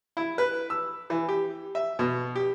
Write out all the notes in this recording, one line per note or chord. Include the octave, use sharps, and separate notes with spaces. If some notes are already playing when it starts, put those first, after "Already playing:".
E4
B4
E6
E3
G4
E5
B2
G4